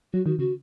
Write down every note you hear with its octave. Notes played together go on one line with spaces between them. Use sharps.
F#3 F#4
D#3 F#4
C#3 F#4